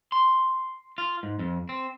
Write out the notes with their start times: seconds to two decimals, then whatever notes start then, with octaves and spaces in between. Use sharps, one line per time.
0.12 C6
0.98 F4
1.23 G#2
1.39 F2
1.69 C4